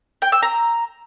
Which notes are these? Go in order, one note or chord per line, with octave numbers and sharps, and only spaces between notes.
G5
E6
A#5